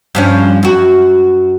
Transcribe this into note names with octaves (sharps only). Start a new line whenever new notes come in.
G2 F3 C#4
F#2 F#4